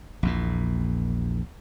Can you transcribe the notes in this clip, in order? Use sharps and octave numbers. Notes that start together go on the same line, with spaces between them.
A#1 E2 A#2